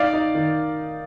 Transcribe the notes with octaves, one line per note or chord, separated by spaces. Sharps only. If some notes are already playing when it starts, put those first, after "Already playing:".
Already playing: D#4 D5 F5
D#4
D#3